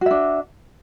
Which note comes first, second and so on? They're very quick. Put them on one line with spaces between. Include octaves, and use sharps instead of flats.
F#4 E5 D4